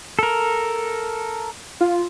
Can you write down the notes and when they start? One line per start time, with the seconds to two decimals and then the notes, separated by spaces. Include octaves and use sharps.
0.19 A4 A#4
1.81 F4